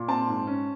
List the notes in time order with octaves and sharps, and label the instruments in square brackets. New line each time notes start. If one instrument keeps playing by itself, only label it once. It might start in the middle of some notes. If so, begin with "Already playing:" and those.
Already playing: [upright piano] A#2
C4 A5
G#2
C#4